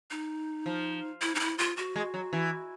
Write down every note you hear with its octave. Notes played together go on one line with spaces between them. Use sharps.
D#4
F3
E4
D#4
E4
F4
F#4
G#3
F#3
E3